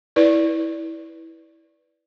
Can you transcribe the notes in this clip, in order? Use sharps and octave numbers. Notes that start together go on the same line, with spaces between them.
E4 B4 D5